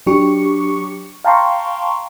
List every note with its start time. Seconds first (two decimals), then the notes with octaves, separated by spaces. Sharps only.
0.07 F#3 D4 G4 C#6 C#7
1.25 F5 G5 A5 A#5 C6 C#6